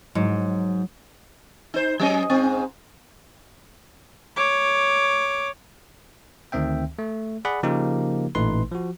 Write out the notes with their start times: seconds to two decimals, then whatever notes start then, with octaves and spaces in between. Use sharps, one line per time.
0.15 G#2 F#3
1.74 D#4 C5
2.00 F#3 C#4 D#5
2.30 G#2 C4
4.36 C#5 D6
6.52 D2 D#3 C4 E5 G5
6.99 A3
7.45 G#4 D5 F#5 B5
7.63 C#3 F3 A#3 D#4 G4 A#4
8.35 A1 A#2 A3 D#4 B4 C6
8.71 F3 F#4